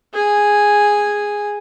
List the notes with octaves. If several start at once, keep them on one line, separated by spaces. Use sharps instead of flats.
G#4 G#5